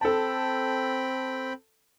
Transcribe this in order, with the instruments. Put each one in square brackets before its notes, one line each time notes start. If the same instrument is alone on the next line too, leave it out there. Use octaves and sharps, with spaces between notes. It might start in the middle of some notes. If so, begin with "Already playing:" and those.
[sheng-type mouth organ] C4 G5 B5 [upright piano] A4 A5